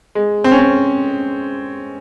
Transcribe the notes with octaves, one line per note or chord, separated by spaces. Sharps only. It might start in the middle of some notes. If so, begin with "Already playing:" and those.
G#3
C4
C#4
C4